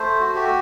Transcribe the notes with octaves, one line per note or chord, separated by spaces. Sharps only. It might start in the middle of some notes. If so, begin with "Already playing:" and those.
Already playing: A3 C5
F#4
G4